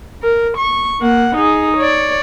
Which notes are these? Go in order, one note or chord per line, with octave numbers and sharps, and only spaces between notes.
A#4
C#6
A#3 F#5
D#4 G#4
C#5 D5